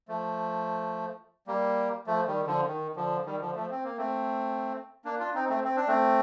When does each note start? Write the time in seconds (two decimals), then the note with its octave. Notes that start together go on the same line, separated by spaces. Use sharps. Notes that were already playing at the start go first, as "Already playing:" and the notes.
0.08 F3 A3
1.47 G3 A#3
2.07 F3 A3
2.27 D#3 G3
2.47 D3 F3
2.67 D#3
2.96 D3 F3
3.26 D#3 G3
3.41 D3 F3
3.55 F3 A3
3.71 C4
3.84 A#3
3.97 A3 C4
5.05 A#3 D4
5.19 D4 F4
5.34 C4 D#4
5.49 A3 C4
5.64 C4
5.76 D4
5.87 A3 C4